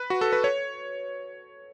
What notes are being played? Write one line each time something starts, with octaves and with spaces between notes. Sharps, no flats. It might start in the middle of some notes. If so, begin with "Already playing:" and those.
Already playing: B4
F#4
A4
B4
C#5